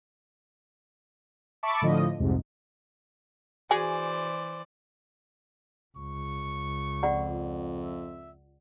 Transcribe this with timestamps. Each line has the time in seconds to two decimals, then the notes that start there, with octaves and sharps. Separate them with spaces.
1.63 E5 A5 B5 C#6 D6
1.82 A2 D3 F3 D#5
2.19 C2 F2 G#2 C3
3.71 E3 F#4 G#4 C5 D5 G#5
5.97 C#2 C#6
7.03 F2 F4 D5 F#5
7.84 E5